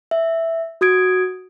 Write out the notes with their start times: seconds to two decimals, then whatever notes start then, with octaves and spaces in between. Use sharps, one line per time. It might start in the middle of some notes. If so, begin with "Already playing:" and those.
0.11 E5
0.81 F#4 D#6 G#6 D7